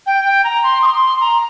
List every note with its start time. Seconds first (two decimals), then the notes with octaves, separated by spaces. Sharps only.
0.06 G5
0.25 G5
0.44 A#5
0.63 C6
0.83 D#6
0.86 C6
1.21 A#5